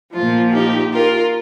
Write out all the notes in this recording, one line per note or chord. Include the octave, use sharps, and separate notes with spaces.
A#2 F3 F4
D#4 G4
F4 A#4